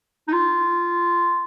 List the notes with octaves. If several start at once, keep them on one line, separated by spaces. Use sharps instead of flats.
D#4
F4